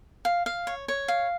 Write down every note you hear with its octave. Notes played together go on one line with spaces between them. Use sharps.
F5
F5
C#5
C#5
F5